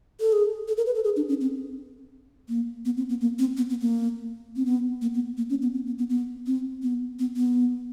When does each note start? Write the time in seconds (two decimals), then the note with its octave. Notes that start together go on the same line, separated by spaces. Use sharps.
0.20 A4
0.33 G#4
0.68 A4
0.77 A#4
0.86 B4
0.95 A4
1.04 G#4
1.16 D4
1.29 C#4
1.41 C4
2.49 A#3
2.85 B3
2.97 C4
3.09 B3
3.21 A#3
3.39 C4
3.57 B3
3.70 B3
3.81 A#3
4.56 C4
4.66 B3
5.02 A#3
5.14 B3
5.37 A#3
5.50 C#4
5.62 B3
5.74 C4
5.86 B3
5.98 B3
6.10 B3
6.47 C4
6.83 B3
7.19 B3
7.37 B3